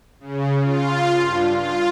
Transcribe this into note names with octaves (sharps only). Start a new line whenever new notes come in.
C#3
F4
G2
F4